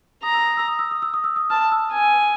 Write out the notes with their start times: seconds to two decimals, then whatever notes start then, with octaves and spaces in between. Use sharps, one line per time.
0.23 A#5 D#6
0.34 E6
0.46 D#6
0.57 E6
0.68 D#6
0.79 E6
0.91 D#6
1.02 E6
1.14 D#6
1.24 E6
1.36 D#6
1.50 A5 F6
1.72 E6
1.93 G#5